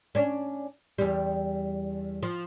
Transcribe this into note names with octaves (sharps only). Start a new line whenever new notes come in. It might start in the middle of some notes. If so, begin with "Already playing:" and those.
C#4 D4
E2 G3
F3